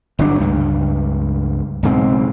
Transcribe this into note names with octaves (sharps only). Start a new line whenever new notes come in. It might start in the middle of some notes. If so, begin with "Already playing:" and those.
G1 G#2 F#3 D4
C#2 G2
B1 G#2 C#3 C4